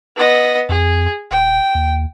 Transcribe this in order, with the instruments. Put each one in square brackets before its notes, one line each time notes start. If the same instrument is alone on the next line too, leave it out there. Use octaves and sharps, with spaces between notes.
[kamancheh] B3 D#5
[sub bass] F2 [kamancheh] G#4
[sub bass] D#1 [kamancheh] G5
[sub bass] D#2